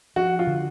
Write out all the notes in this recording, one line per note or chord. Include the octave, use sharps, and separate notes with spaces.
F3 F#4
F4
D3